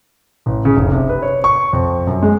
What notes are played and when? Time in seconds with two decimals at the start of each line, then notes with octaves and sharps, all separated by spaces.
0.46 A1
0.65 C#3
0.77 F1
0.91 C3
1.09 B4
1.22 C#5
1.44 C#6
1.73 F2
2.07 F#2
2.23 G#3